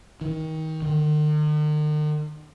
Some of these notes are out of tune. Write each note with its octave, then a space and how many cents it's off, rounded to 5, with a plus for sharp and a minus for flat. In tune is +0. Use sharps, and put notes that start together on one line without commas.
D#3 +25
D#3 -45